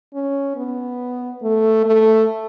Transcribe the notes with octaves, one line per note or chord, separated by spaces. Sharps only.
C#4
B3
A3
A3